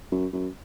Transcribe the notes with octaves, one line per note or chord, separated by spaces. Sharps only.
F#2
F#2